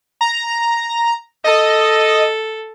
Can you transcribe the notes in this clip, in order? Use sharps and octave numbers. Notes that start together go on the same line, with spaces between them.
A#5
A4 D#5